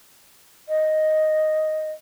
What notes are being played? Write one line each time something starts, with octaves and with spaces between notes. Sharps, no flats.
D#5